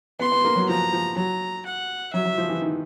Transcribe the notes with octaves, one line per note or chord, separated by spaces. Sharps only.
B3 C6
B3
A#3
F#3
F3 A#5
F3
F#3 A#5
F#5
F#3 E5
F#3
F3
E3
D#3